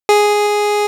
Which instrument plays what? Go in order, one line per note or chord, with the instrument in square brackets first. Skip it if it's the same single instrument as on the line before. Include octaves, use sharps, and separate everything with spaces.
[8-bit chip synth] G#4